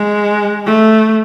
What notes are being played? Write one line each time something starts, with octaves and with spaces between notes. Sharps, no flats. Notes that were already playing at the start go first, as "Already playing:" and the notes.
Already playing: G#3
A3